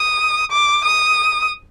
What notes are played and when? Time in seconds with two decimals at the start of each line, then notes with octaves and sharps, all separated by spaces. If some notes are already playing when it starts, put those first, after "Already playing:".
Already playing: D#6
0.51 D6
0.85 D#6